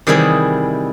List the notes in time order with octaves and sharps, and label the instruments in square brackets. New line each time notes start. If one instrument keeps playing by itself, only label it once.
[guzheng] C3 D#3 E3 G3 E4 G#4